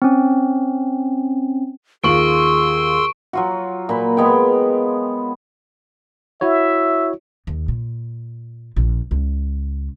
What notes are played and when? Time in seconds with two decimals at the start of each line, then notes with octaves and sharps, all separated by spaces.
0.02 C4 C#4
2.04 D#2 F4 G#4 C6 C#6 E6 D7 F#7
3.33 F#3 F4 F#4
3.89 A#2 B5
4.17 G#3 B3 C#5 G5
6.41 E4 F#4 C#5 E5
7.47 D#2
7.68 A#2
8.76 A#1
9.11 C#2